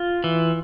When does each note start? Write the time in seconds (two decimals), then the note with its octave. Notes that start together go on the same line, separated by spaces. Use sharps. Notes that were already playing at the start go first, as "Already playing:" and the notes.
Already playing: F4
0.24 E3